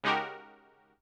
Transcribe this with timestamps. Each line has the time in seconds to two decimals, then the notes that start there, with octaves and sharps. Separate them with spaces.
0.04 C#3 G#3 D#4 F#4 G4 A#4